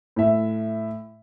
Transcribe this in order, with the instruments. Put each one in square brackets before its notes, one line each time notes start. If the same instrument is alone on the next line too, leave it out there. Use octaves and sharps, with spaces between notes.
[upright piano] A2 E5